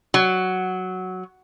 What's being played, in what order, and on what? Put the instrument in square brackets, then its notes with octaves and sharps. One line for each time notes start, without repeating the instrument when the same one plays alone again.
[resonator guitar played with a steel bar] F#3